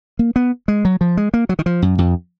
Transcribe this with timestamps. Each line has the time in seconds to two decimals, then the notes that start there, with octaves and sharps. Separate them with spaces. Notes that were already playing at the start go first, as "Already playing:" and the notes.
0.19 A#3
0.36 B3
0.68 G#3
0.85 F#3
1.01 F3
1.17 G#3
1.34 A#3
1.49 F#3
1.59 D#3
1.66 F3
1.82 F#2
1.98 F2